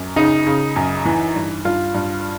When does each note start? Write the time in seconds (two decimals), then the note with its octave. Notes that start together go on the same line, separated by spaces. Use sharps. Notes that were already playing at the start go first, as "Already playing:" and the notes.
Already playing: F#2
0.16 C#3 D#4
0.47 C#3
0.76 F#2
1.05 E3
1.35 G2
1.65 G2 F4
1.94 G2